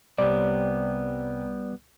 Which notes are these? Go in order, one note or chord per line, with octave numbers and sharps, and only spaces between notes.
C2 C3 G3 B3 C#5 D5